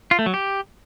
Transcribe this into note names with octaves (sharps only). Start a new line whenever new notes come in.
F4
A3
F#3
G4